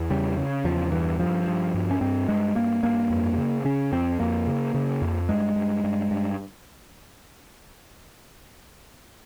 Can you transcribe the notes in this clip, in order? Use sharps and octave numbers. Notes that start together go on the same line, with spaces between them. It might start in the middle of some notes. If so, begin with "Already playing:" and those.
Already playing: E2
C#3 G3
C#3
E2 F3
G2 E3
G2 F3
G2
G2
C#4
G2 C4
G2 G#3
G2 A#3
G2 A#3
F2
C#3
C#3 C#4
F2 C4
F2 A#3
C#3
C#3
F2
G2 G#3
G2
G2
G2